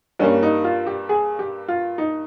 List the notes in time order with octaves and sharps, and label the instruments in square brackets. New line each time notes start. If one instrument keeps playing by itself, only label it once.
[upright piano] G2 G3 A#3 C#4
D#4
F4
G4
G#4
G4
F4
D#4